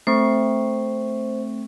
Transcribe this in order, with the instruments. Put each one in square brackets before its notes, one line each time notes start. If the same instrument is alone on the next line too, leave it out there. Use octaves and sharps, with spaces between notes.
[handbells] A3 C4 C#6 [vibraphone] C5